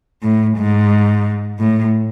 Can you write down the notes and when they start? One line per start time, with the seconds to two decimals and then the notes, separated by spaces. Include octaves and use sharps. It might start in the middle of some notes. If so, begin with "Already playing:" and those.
0.23 A2
0.58 G#2
1.60 A2